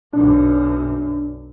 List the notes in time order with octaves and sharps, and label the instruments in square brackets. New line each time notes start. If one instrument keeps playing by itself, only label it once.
[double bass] B1 F#2 [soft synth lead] D4